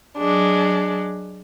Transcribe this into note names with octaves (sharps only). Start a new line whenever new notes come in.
F#3 G#3 D4